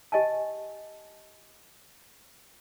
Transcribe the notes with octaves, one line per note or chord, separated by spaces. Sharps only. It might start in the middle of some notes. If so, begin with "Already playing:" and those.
G4 D#5 G#5 A5